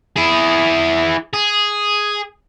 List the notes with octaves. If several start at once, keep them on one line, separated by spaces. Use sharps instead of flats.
E4 G#4
G#4